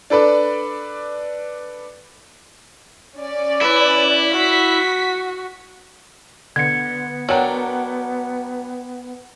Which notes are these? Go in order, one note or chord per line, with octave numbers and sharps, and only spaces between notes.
D4 A4 B4 D5
C#4 D5
E4 B4
F#4 B6
D3 B3 G#6 C#7
F#3 D4 A#4 F#5 G5